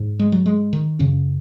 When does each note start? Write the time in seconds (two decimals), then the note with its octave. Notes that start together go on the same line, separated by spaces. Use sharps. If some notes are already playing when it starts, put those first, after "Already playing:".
Already playing: G#2
0.19 G#3
0.32 F#3
0.46 G#3
0.73 D#3
0.99 F#2 C#3 C#4